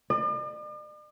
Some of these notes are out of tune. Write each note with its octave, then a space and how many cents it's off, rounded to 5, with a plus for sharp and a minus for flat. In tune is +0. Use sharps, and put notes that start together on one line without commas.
D5 +45